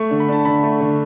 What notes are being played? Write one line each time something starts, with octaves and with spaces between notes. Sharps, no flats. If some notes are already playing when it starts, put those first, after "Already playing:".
Already playing: A3 C#6
D3
B5
D4 A5
D3 B5
A3
D3